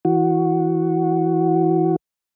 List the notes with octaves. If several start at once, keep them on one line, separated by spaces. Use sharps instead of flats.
E3 F#4